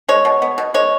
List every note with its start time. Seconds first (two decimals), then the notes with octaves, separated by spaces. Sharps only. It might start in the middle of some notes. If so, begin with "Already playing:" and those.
0.08 G#3 C#5
0.25 B2
0.42 B3
0.58 B2
0.74 G#3 C#5